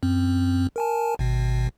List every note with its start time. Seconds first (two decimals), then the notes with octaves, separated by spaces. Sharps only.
0.03 F#2 C4
0.76 A#4 G#5 A5
1.19 G#1 B2